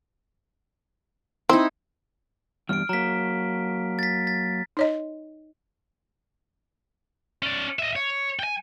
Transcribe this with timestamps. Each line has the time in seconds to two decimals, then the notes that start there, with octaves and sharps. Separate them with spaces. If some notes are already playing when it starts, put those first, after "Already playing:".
1.49 C4 D#4 E4
2.69 E2 G2 G3 F6 D7
2.89 F#3 A#3 A#5 B6
3.99 A6 B6
4.27 A6 B6
4.77 D#4 C#5 D#5
7.43 C#4 D5
7.79 D#5 E5
7.96 C#5
8.39 G5 G#5